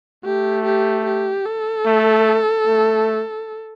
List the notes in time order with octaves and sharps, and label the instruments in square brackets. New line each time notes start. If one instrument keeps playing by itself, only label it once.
[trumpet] A3 [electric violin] G4
[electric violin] G4
G4
A4
[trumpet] A3
A3